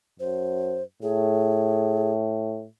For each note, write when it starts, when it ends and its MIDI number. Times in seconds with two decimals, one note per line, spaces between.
0.20 0.82 42
0.20 0.83 72
1.02 2.65 45
1.02 2.12 68